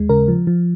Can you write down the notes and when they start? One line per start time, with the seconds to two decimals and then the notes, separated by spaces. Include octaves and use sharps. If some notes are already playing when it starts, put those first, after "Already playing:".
Already playing: D#2 G#3
0.09 C#3 A#4
0.28 F3
0.47 F3